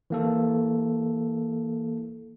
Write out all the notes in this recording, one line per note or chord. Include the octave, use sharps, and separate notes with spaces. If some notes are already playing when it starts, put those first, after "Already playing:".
E3 A#3 A4